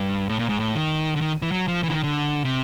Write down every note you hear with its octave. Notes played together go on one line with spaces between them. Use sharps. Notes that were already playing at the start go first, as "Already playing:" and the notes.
Already playing: G2
A2
A#2
G#2
A2
D#3
D3
D#3
E3
F#3
F3
D3 E3
D#3
D3
C3